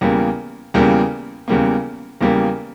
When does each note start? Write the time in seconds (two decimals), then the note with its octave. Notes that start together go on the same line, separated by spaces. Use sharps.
0.01 E2 C#3 G3 A#3
0.74 E2 C#3 G3 A#3
1.48 E2 C#3 G3 A#3
2.21 E2 C#3 G3 A#3